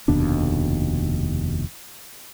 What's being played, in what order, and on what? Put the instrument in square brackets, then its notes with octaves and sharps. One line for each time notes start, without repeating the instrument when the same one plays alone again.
[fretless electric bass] F1 D#2 B2 D4